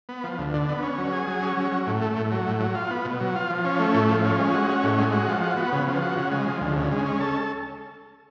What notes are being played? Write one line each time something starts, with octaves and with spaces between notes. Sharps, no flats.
B3
F3
D2
D3
B3
C#4
F#3
G#4
F#3
C#4
F#3
F#3
A2
A3
A2
F#3
A2
F#3
F4
B3
B2
F#3
F4
F3
C#4
A3
A2
F3
C#4
G#3
F#4
C#4
A2
G#3
F#4
F3
F#4
B3
C#3
F3
F#4
C#3
G#3
F3
D2
C#3
G#3
C#4
A4